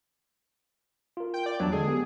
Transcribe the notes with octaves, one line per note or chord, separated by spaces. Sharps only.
F4 A#4
G5
D5
E2 F#3 D4 A5
D3 G#3 G#4 A4
B3 G4